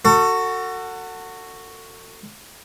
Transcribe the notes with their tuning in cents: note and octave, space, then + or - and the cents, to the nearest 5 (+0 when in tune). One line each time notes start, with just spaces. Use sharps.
F#4 +0 A4 +35